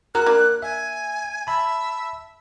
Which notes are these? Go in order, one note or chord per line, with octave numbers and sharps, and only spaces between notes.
G#3 F#4 A#4 A#5 F#6
A#3 D4
E5 G#5
E5 A5 B5